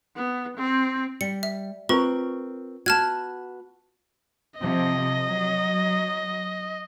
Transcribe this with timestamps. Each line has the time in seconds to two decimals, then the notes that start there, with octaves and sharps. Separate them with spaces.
0.16 B3
0.57 C4
1.21 G3 C#7
1.43 E5
1.89 C4 F4 A#4 B4 C#6
2.86 B3 F#4 A5 F6 G#6
4.60 C3 F3 C4 D#5
5.29 F#3